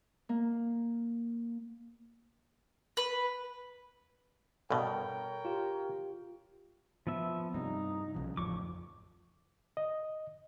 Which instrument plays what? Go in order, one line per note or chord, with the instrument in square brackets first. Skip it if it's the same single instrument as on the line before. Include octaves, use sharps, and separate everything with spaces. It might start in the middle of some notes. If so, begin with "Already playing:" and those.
[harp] A#3
[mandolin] B4
[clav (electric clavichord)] G2 B2 [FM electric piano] A4 [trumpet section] A#4 C#5 G5
[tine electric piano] F4 G4
[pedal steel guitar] F3 B3 E5
[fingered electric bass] G2 C3 [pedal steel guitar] D#4
[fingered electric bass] B1 C#3 F3
[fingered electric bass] A1 F2 F3 [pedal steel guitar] C#6 D6
[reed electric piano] D#5